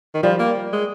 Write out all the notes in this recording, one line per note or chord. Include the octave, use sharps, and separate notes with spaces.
D#3
F3 G3
A#3
G#3